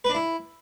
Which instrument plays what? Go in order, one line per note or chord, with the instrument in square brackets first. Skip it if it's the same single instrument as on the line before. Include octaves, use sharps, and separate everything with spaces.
[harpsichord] B4
D4
E4